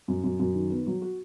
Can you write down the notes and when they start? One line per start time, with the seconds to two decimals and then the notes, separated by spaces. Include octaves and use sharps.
0.08 F#2
0.24 F#2
0.40 F#2
0.54 D#3
0.70 B3
0.87 F#3
1.02 F#4